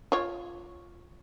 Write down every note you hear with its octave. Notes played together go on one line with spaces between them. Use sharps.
F4 C#5